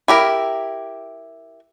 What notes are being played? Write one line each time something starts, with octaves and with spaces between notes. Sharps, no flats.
E4 G4 A#4